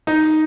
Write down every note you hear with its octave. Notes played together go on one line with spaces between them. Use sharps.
D#4